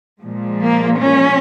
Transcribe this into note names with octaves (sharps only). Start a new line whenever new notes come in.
A#2 F3 G#3
A#3
C#4